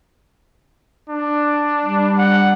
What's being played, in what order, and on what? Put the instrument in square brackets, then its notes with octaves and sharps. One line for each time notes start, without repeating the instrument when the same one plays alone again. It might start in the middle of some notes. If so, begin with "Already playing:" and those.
[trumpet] D4
[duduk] G3
[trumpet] F#5